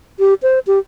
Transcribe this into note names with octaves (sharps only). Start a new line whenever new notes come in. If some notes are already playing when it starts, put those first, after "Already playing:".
G4
C5
G4